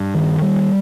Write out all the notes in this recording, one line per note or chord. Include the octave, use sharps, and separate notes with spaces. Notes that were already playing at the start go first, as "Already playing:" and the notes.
Already playing: G2
D#3
G3